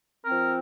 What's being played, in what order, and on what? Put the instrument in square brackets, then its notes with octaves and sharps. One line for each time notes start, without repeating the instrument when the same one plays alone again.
[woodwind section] F3 C4 A#4